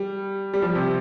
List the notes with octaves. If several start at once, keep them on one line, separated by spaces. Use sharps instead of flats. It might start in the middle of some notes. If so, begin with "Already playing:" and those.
Already playing: G3
G3
F3
C3